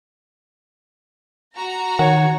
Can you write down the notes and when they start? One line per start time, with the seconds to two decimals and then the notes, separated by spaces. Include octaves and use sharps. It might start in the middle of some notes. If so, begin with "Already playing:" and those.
1.56 F#4 A#5
1.99 D#3 C#5 F#5